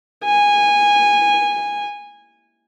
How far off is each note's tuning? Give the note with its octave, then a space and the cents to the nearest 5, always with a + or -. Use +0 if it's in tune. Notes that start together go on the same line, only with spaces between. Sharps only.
G#5 -15